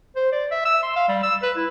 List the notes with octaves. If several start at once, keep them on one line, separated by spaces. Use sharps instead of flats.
C5
D5
E5
E6
C6
F5
G3
E6
B4
E4